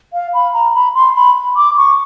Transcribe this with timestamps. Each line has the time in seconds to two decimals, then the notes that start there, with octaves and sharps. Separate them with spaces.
0.13 F5
0.34 B5
0.54 A#5
0.74 B5
0.95 C6
1.16 B5
1.56 D6
1.77 C#6